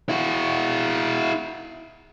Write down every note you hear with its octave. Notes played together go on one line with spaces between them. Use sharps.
E4 F#4